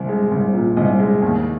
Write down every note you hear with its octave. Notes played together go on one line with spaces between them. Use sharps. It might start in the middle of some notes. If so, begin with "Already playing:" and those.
Already playing: C2
G#3
C2
A#2
C2 D#5
G#3
D#2